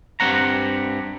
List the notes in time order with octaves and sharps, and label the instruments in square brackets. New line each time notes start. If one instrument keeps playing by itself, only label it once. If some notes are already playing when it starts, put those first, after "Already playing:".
[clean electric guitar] G2 G3 A#3 C4 F#5 A#5